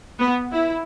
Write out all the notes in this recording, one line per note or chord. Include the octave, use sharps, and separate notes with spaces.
B3
E4